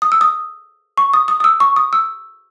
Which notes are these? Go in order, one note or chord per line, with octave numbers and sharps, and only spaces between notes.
D#6
E6
D#6
C#6
D#6
D#6
D#6
E6
C#6
D#6
E6